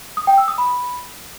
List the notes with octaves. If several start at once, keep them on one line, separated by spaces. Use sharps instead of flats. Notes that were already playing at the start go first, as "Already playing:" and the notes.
D#6
G5
E6
D#6
B5